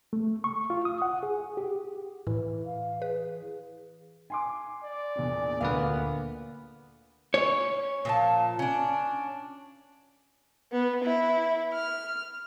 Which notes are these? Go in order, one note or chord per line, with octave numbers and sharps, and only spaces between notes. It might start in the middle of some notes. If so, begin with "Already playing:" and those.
A3
C#6
F4
D#6
F#5
G#4
G4
A2 E3
F5
G#4 B4
G#5 C6 D6
D5
E2 A#2 D4
D2 A#2 D3 A#3 B3 B4 F5
C#4 C#5
A#2 F3 A5
C#4 D4
B3
E4
F6